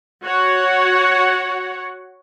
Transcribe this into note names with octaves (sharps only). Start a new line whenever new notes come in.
F#4 C#5 F#5